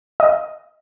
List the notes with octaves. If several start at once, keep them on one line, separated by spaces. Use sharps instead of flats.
D#5